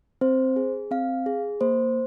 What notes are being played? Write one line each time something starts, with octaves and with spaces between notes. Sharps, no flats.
C4 C5
G#4
C4 F5
G#4
A#3 C5